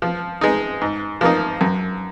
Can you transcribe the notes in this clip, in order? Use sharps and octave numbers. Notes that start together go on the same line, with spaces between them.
F3
G#3 D#4
G#2
F3 A#3 D#4
F#2